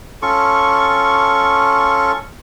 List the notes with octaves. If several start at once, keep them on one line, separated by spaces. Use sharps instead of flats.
C#4 F4 A4 C#6